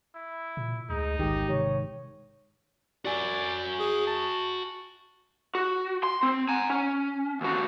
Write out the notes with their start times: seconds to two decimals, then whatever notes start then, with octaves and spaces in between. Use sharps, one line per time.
0.15 E4
0.57 A#2
0.90 D2 G#3 D#4
1.19 A1 G#2 D#3 G4
1.49 C3 C#5
3.05 F#4 D5 G#5
3.79 G#4
4.07 A5
5.55 F#4
6.03 C6
6.23 C4
6.49 G#5 A#5
6.70 C#4
7.41 D#2 F#4